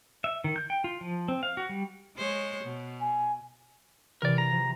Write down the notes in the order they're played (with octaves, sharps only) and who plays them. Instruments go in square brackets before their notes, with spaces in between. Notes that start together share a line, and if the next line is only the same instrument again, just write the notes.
[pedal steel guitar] E5
D#3
G6
G5
F4
F3
C4
F5
F#4
G3
[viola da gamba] G#3 C5 C#5
B2
[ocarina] G#5
[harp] C3 E3 [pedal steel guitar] A#4 D5
[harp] A#4 [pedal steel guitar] A#5
[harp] F3